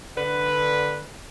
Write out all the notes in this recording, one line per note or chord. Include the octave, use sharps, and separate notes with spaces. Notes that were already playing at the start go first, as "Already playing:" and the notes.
D3 B4